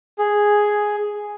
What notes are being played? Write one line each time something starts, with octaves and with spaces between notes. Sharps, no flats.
G#4